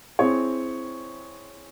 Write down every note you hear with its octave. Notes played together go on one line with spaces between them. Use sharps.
C4 E4 G#4 C#5